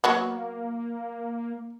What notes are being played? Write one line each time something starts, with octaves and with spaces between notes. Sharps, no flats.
F#3 A#3 B3 F#4